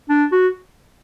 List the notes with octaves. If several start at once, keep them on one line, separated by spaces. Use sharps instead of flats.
D4
F#4